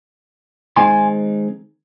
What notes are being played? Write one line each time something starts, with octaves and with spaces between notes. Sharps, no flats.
D#3 G#3 C4 D#4 G#5 C6